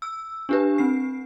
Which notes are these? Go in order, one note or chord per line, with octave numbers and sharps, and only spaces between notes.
E6
D4 G4 B4
C4 C7